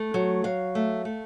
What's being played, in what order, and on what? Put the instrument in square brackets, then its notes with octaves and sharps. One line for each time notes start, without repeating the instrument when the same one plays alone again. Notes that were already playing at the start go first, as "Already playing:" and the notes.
Already playing: [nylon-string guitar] A3
F#3
F#3 F5
A3
A3